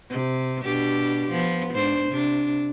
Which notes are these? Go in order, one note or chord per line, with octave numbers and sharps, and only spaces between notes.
C3
B2 D4 G4
F3 B3
G#2 D4 C5
C3 D4